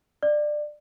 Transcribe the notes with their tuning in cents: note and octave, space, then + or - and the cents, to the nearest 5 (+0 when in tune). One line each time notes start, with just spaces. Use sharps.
D5 +20